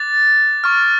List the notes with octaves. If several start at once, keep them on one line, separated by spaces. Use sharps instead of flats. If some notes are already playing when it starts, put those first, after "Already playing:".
Already playing: D6 F#6 A6
C#6 F6